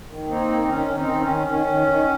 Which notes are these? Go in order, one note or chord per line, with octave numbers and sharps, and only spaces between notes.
D#3
A#3 C4 D#4
D#3
D#3 C#4
D#3
C4 D#4
D#3
C#4
D#3
D#3 C#4
D#3
D#3